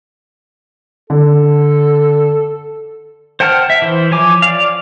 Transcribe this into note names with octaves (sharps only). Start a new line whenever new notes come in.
D3 A4
C5 F#5 G5 A5 F6
E5
E3 C5
F3 C#5 G#5 D6
D5 F5